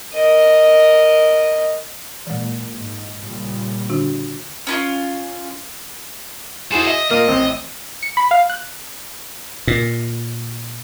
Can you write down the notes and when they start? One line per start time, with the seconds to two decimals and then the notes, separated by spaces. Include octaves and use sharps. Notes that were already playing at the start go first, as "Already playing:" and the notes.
0.13 A#4 D#5
2.27 A#2 E3 G#3
2.74 G#2
3.21 A#2 C#3 G3
3.90 D3 D4 F#4
4.67 C#4 E4 F4
6.72 E4 F#4 G#4 A4 C5
6.87 D#5 E5
7.11 A#2 A#3 D#5
7.28 A1 C4
8.03 C#7
8.17 B5
8.31 F5
8.50 F#6
9.67 A#2